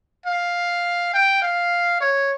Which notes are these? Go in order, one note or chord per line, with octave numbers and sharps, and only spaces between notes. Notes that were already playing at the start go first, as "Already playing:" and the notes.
F5
G5
F5
C#5